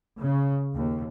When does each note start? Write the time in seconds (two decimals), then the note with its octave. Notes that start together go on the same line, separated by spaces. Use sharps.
0.19 C#3
0.74 D#2